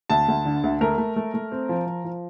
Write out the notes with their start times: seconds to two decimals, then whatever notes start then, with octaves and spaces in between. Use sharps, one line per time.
0.10 D2 A5
0.28 D2
0.45 D3
0.64 D2
0.81 A3 A#4
0.98 A3
1.16 A3
1.34 A3
1.52 C4
1.69 F3
1.86 F3
2.05 F3